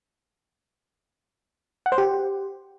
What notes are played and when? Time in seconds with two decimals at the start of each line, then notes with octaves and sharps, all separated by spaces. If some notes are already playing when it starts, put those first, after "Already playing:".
1.86 F#5
1.92 C5
1.98 G4